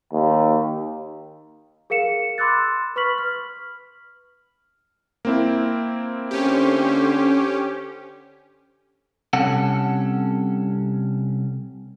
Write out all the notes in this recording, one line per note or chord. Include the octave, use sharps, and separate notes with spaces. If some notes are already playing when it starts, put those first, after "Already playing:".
D#2
G#4 A#4 F5 C#7 E7
B5 C6 D6 E6 F#6 A6
B4 B5 C#6 F6 B6 F#7
F6
A#3 C4 E4
D3 C#4 G4 C5
C2 C3 C#4 A4 F#5